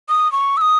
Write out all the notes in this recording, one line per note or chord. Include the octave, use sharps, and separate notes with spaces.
D#6
C#6
E6
D#6